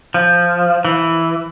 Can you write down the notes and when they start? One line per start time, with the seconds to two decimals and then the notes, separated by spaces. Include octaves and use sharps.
0.14 F3
0.85 E3